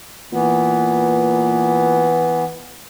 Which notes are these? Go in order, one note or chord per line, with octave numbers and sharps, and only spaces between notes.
A#2 E3 B3